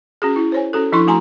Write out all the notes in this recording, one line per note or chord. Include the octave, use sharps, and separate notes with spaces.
C#4 F#4 G#4
E4
C5 C#5 G#5
C#4 F#4 A4
F3 D4 E4 A4 C6 C#6
F3 A3 F#4 G#5 A#5 C6